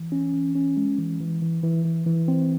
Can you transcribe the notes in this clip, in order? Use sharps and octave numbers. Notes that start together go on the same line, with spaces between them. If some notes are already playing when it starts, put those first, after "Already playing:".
Already playing: E3
C#4
E3
C#4
G#3
E3
E3
E3
E3
E3
E3
C4